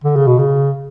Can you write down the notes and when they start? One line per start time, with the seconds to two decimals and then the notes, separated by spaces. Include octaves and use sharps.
0.04 D3
0.16 C#3
0.27 B2
0.39 C#3